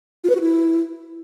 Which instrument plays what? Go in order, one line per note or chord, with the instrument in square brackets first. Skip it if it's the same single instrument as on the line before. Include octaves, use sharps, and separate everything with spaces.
[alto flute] F4
B4
F#4
E4